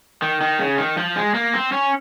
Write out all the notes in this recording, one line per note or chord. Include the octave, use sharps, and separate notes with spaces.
D#3
D#3
C#3
D#3
F3
G#3
A#3
C4
C#4